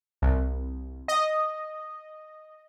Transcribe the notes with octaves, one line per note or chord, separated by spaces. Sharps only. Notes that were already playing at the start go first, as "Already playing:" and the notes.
C2
D#5